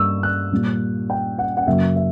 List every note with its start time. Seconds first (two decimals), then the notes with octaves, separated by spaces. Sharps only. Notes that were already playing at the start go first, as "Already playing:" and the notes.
Already playing: G2 G3 A#3 C#6 E6
0.23 F#6
0.52 A#2 G3 A#3
1.10 G5
1.39 F#5
1.57 F#5
1.67 F#2 C#3 F#3 A#3 E5
1.96 E5